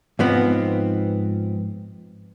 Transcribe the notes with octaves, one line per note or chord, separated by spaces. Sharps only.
G#2 F3 B3 C4